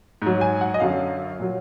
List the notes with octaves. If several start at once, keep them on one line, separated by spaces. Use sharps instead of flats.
G#2 F#3
G#5
F#5
D#5
F#2 D3 F#3 F5
A#2 F#3